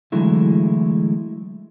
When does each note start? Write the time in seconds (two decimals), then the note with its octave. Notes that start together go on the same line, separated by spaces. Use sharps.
0.12 D3 E3 F#3 G#3 A3 E4